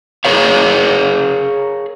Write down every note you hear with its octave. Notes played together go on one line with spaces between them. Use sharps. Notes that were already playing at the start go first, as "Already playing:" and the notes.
G#4 A#4 C#5 F5